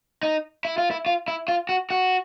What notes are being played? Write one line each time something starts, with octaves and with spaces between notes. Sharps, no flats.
D#4
E4
F4
E4
F4
E4
F4
F#4
F#4